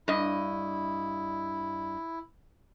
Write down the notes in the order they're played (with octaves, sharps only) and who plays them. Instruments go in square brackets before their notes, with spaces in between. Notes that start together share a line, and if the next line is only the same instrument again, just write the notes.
[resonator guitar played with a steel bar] G2 D#5 [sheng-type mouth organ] E4